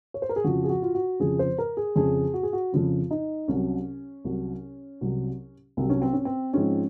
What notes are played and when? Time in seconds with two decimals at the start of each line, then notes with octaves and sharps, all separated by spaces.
0.14 C#5
0.22 C5
0.29 A#4
0.36 G#4
0.44 F2 C#3 F3 F#4
0.64 G#4
0.69 F#4
0.82 F4
0.95 F#4
1.20 F2 C#3 F3 G#4
1.39 C5
1.58 A#4
1.77 G#4
1.96 F2 C#3 F3 G#4
2.34 F#4
2.43 G#4
2.53 F#4
2.72 F2 C#3 F3 F4
3.11 D#4
3.48 C2 C3 F#3 C#4
4.25 C2 C3 F#3
5.01 C2 C3 F#3
5.77 C2 C3 F#3 C4
5.90 C#4
6.02 C4
6.13 C#4
6.25 C4
6.53 G#2 F3 G#3 C4 C#4